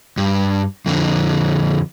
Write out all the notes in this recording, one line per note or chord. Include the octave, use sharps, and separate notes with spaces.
G2
F2 D3